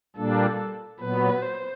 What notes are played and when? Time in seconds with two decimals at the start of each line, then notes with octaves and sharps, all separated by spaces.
0.16 A#2 G3 A#3 D4 A4
1.00 A#2 F#3 B3 B4
1.42 C5